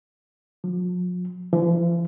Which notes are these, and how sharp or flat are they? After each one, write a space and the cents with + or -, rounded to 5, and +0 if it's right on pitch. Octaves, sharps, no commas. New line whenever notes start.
F3 +45
F3 -45